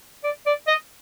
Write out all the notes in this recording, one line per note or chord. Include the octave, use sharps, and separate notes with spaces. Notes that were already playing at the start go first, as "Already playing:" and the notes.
D5
D5
D#5